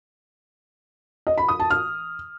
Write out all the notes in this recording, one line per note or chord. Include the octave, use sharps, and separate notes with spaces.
D#5
B5
D#6
A5
F6